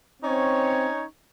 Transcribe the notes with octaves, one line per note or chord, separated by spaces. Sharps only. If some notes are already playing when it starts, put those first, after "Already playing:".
C4 C#4 D#4 C#5